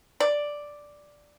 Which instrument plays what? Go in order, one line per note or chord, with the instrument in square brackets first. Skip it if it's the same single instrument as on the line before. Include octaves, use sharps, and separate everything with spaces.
[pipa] D5